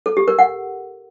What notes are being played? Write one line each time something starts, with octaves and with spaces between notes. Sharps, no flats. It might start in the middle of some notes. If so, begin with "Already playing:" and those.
A4
G4
A#4
F#5